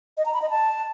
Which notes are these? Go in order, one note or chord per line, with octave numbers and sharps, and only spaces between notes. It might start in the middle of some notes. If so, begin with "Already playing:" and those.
D#5
A#5
B5
D#5
A5